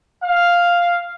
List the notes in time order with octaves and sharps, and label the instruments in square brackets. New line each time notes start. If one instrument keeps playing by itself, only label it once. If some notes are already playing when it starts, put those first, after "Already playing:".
[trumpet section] F5